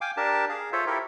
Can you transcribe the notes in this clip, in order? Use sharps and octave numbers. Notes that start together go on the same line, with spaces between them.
F5 G5 G#5 D6
D4 G4 A#4 A5
G#4 F5
F4 A4 C5 C#5 E5
E4 G4 A4 A#4